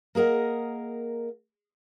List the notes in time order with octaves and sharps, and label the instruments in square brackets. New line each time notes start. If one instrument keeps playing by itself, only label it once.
[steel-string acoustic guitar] A#3 G#4 A#4 D#5 F#5